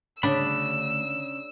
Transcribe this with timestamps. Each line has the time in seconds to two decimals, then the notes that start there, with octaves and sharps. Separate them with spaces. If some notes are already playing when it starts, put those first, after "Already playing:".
0.23 D2 C#3 D4 B5 E6